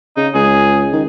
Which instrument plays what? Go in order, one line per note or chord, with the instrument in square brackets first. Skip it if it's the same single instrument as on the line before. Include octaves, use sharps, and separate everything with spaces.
[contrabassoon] C#3 [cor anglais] D#4
[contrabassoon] C#2 [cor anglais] G#4
[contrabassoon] D#3